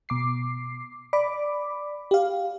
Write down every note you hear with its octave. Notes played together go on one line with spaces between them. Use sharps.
B2 D6 C7
D5 B5 D6
G4 F5